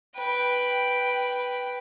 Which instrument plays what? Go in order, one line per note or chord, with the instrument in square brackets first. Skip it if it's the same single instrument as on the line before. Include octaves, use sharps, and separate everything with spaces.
[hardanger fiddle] B4 G5